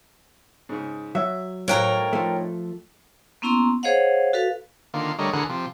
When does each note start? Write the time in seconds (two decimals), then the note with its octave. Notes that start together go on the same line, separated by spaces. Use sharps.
0.69 G#2 C#3
1.15 F#3 E5
1.68 A2 D#4 A#4 C#5 F5 G5 A#5 F#6
2.13 F3 A3
3.42 A#3 B3 C#4 E4 A#5 C6
3.83 G#4 C5 C#5 D#5 F5 F#5
4.33 F#4 A4 B4 F5
4.94 D3 D#3 A#3 F4
5.19 D3 G3 A3 A#4 C#5 D#5
5.33 D2 D3 E3 G#4 A#4 F#5
5.49 C3 F3